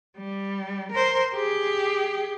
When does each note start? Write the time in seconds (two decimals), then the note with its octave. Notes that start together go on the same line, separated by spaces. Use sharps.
0.17 G3
0.91 A#4 C5
1.35 G4 G#4